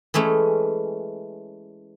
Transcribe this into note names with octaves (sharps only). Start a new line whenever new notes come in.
E3 G#3 A3 C#4